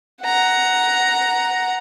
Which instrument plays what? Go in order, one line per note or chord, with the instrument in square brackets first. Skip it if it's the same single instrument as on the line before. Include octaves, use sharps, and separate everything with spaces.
[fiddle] F#5 A#5